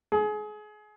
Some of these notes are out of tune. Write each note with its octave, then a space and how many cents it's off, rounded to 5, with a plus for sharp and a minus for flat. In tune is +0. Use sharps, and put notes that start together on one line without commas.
G#4 +30